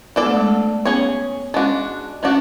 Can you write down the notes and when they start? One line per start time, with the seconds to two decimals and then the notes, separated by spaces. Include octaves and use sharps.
0.16 B3 D4 A4 D5
0.26 A3
0.37 G#3
0.48 A3
0.85 B3 C#4 G#4 C#5
1.54 G#3 C#4 D4 F#4
2.23 A3 C#4 D4 F#4